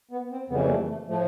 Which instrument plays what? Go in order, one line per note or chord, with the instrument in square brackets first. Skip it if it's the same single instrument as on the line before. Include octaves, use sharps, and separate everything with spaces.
[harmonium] B3
C4
F2 C#3 E3 G3 B3
A#3
A3
A3
A2 F3 A3